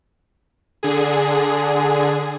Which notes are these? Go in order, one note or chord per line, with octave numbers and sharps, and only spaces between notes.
D3 G#4